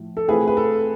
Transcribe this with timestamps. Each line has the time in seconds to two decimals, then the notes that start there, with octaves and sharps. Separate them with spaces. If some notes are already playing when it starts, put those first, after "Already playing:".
Already playing: A2 F3
0.17 A4
0.28 E3 A3 C4 F4 G#4 B4
0.48 B4
0.57 A4